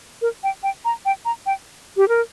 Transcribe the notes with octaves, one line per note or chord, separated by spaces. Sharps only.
A#4
G5
G5
A#5
G5
A#5
G5
G4
A#4